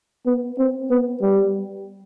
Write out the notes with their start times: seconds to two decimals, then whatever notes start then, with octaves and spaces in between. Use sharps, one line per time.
0.26 B3
0.58 C4
0.90 B3
1.21 G3